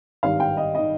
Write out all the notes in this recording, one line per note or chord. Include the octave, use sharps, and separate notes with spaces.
G#1 G2 D#3 F5
G5
D#5
D#3 D#5